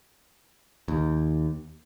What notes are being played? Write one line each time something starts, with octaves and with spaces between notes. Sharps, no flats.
D#2